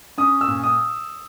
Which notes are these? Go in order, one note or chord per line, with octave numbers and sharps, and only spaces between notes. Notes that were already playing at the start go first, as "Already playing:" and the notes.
C#4 D#6
E6
A#2
D#6